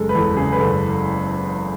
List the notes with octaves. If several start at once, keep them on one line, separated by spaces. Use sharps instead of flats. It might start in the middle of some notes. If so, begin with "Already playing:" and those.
Already playing: F#1 G#3 A4
B4
E2 A4
C#3 G#4
B4
F#1 A4